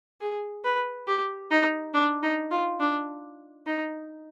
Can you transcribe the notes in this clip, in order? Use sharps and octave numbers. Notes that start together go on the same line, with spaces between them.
G#4
B4
G4
D#4
D4
D#4
F4
D4
D#4